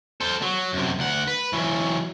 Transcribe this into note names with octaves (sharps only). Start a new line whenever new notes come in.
A4 C5
F#3
F#2 C3
D2 F#5
B4
E3 F#3